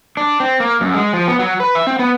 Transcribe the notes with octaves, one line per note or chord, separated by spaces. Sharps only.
D4
C4
A#3
F#2
G#3
F3
B3
F#3
B4
E5
C4
B3